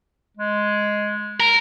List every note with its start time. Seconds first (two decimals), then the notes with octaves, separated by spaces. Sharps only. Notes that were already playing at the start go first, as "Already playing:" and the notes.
0.37 G#3
1.40 A#4